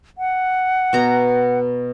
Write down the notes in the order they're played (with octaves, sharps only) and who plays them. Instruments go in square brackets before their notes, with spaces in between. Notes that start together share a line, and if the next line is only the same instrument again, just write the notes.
[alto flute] F#5
[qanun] B2 A#5